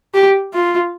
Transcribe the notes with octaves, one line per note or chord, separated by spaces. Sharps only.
G4
F4